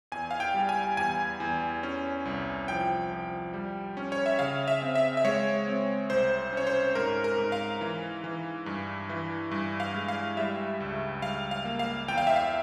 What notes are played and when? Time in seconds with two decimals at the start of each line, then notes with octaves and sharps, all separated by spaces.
0.12 E2 G#5
0.31 F5
0.40 G5
0.54 G3
0.69 G#5
0.97 E2 G#5
1.40 E2
1.83 C#4
2.25 C2
2.68 F3 G5
3.12 F3
3.54 G3
3.97 C#4
4.12 C#5
4.26 E5
4.39 C#3 F5
4.68 E5
4.82 C4
4.95 E5
5.17 E5
5.25 G#3 C#5
5.67 C4
6.10 C2 C5
6.53 C#4 C#5
6.67 C5
6.95 G#2 A#4
7.24 A#4
7.38 G#2
7.52 F5
7.81 E3
8.24 E3
8.66 G2
9.09 E3
9.51 G2
9.80 F5
9.94 G#3
10.08 F5
10.37 G3 E5
10.80 C#2
11.22 G3 F5
11.51 F5
11.65 A#3
11.79 F5
12.08 E2 G5
12.18 F5
12.27 E5
12.36 F5